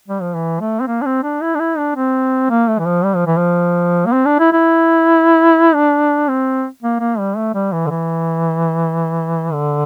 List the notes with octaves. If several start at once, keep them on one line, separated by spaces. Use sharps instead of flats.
G3
F3
E3
A3
C4
A#3
D4
C4
D4
E4
D4
E4
D4
C4
A#3
A3
E3
F3
G3
F3
E3
F3
A#3
C4
D4
E4
E4
D4
C4
A#3
A#3
G3
A3
G3
E3
D3
E3
D3